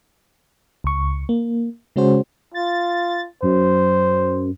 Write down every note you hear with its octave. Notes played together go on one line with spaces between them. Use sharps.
C#2 C#6
A#3
C#3 G#3 C#4 F#4 C5
F4 A6
F#2 C5